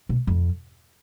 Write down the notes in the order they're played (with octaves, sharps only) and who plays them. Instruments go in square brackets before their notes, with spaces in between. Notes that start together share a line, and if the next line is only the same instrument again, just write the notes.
[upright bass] B2
F2